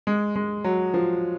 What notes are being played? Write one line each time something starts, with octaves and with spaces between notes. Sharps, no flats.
G#3
G#3
F#3
F3